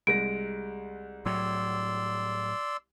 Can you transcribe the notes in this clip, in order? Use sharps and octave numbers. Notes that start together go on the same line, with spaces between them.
C2 G#3 A#6 D7
A2 F#3 D5 C6 E6